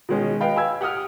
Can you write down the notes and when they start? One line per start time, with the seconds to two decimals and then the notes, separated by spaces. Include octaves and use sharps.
0.09 B2 D#3 G#3 C#4
0.41 B4 D#5 F5 G5 B5
0.56 G#5 B5 E6 G#6
0.81 G4 F#5 G5 D#6 F6